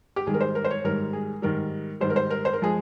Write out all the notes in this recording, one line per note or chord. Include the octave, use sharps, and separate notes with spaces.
G4
G#2 D#3 G3 G#4
A#4
C5
A#4
C5
C#5
G#2 D#3 G3 A#4
G#4
G#2 D#3 G3 A#4
G#2 D#3 G3 C5
A#4
C5
A#4
C5
A#4
F3 G#3 G#4